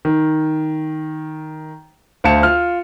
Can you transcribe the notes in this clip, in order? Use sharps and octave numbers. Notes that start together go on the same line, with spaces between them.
D#3
D2 C5 F5 A5 C#7 E7
F4 F6